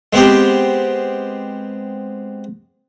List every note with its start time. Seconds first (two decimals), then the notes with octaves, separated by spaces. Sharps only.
0.13 G#3 B3 C4 G4